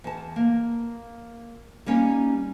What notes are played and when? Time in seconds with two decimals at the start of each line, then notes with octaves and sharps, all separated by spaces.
0.04 E2 A5
0.36 A#3
1.86 G3 A#3 C#4 D#4